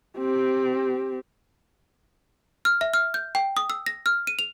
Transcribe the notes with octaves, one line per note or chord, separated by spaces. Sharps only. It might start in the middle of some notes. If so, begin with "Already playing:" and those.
C4 G4
F6
E5
F6
G6
G5
D#6
E6
A#6
F6
D#7
F7